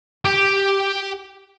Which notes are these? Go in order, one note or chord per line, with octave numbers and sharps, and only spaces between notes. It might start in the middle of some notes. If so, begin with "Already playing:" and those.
G4 G5